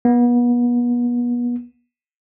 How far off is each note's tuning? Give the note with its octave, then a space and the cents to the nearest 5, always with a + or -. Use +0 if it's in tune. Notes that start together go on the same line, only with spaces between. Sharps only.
B3 -35